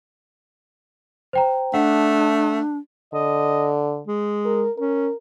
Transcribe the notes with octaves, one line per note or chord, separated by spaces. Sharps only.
C5 G5 A#5
A3 D4 F#5
D3 D#5
G#3
A#4
C#4 A#4